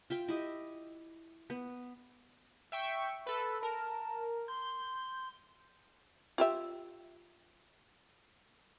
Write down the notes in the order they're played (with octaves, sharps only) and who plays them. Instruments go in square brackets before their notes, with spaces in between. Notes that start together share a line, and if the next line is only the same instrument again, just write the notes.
[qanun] F4 E5 G5
E4 G4 D#5
B3
[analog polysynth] E5 G5 C#6
[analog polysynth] A4 B4 [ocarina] B5
[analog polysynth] A#4 [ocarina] A5
[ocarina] C6 [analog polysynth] G6
[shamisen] F4 G4 E5